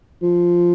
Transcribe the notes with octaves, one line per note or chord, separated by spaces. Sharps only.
F3